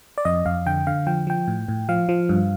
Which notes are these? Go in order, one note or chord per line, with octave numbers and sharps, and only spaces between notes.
D5
F2 D#5
F2 F5
D3 G5
D3 F5
F3 G5
F3 G5
A2
A2
F3 F5
F3
G2